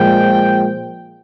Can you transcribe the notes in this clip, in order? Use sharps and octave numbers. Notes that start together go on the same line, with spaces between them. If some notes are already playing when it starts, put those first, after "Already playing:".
Already playing: A#2 F3 G#3 G5